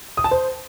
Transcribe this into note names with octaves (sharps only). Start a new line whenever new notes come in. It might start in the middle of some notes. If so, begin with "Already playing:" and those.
D#6
A5
C5